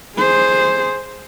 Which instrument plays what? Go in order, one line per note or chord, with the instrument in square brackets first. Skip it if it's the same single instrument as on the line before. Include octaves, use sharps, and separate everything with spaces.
[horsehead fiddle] G#4 C5